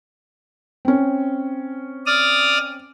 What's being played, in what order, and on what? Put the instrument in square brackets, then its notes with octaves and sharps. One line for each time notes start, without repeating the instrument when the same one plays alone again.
[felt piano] C4 C#4
[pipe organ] D5 D#6 F6